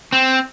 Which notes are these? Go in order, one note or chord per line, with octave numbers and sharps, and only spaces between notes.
C4